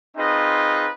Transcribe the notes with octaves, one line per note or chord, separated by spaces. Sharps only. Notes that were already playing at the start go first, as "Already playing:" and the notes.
C4 D#4 F4 G#4 B4 D#5